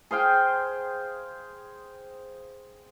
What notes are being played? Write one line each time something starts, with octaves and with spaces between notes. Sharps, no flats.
G#4 C5 F5 G5